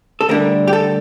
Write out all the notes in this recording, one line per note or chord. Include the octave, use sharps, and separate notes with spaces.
A4
D2 D3 G3 A#4
G4
A4